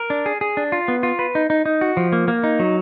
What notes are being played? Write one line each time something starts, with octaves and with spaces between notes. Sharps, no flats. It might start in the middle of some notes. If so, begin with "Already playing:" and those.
Already playing: A#4
D4
G#4
G#4
D4
F4
B3
F4
B4
D#4
D#4
D#4
F#4
F3
A#3
A#3
D#4
F#3